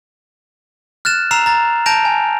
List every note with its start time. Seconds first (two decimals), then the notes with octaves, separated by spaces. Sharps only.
1.05 F6 F#6 A6 E7
1.31 A#5 E6 C7 E7 F7
1.46 A#5 A6
1.86 A5 G6 A#6 D7 F7
2.05 G#5